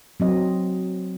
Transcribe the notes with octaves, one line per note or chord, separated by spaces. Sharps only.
F#3 C4 D#5